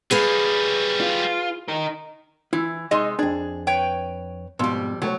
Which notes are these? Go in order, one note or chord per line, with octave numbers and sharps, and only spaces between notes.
F#3 G3 G#4 B4 F5
F4
D#4 A#4
E3 E4
C3 G#3 D#4 G#4 D#5
F2 D4 G#4
B4 C#5 G5
F2 G#2 B2 G3
C2 F#3 A3 C#5